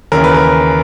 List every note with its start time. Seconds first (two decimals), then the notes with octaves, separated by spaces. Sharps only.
0.12 D#2 C#3 E3 A#4
0.24 B4
0.34 A#4